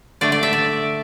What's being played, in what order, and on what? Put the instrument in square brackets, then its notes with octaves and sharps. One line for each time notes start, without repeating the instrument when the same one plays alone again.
[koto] D3 A3 D5
D5
E5
D5